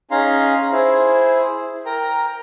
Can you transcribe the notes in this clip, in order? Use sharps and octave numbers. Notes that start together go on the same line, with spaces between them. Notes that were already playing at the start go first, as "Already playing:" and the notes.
C#4 D#4 G#4 F5 A#5 C6
E4 G#4 C5
A#4 G5 A#5